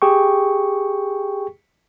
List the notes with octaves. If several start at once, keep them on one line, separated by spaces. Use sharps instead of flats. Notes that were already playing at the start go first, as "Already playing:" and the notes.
G4 G#4 G5 C#6